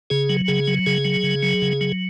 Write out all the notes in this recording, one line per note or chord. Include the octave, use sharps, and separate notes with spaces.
C#3 G#4
F#3
C#3 G#4
F#3
C#3 G#4
F#3
C#3
F#3
C#3
F#3